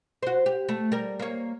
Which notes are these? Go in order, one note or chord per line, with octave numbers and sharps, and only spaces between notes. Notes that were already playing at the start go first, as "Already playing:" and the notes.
F#4 C5
G4
A3
G3 A#4
A#3 C#5